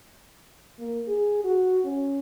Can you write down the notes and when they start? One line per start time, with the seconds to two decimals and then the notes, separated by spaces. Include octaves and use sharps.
0.79 A#3
1.08 G#4
1.44 F#4
1.85 C#4